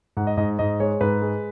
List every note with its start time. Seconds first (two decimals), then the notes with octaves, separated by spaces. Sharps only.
0.17 G#2 F#5
0.27 D#5
0.37 G#2 D#5
0.59 G#2 D#5
0.80 G#3 C#5
1.01 G#2 B4
1.22 G#3